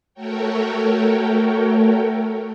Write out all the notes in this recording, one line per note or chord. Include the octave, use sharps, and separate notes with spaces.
A3 F#4 A4 A#4 C#5 G5